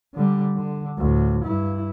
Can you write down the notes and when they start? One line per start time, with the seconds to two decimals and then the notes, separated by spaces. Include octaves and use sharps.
0.15 D3 G3
0.57 D3
0.99 D2 A2
1.44 G2 E4